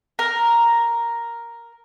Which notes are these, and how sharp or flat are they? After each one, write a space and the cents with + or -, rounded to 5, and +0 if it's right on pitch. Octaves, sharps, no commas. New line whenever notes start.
A#4 +0